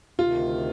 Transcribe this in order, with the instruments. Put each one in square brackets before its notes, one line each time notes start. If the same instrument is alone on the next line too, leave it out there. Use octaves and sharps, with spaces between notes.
[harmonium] D2 C3 D#3 [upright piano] F4